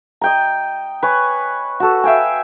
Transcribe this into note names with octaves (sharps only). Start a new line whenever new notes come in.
D#5 G5 A#5
B4 C#5 G#5
F#4 A4
E5 F5 G5 G#5